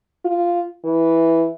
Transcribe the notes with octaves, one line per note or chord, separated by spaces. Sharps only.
F4
E3